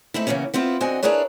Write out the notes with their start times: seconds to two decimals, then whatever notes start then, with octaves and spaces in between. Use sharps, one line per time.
0.14 A3 C4 D#4 E4
0.27 C#3 E3 A#3 B3 C#4
0.54 B3 C4 E4 F4
0.80 D3 C4 F#4 D#5 G#5
1.03 D4 E4 G#4 A#4 B4 C#5